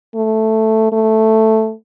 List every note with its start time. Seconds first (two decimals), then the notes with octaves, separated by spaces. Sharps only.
0.15 A3
0.92 A3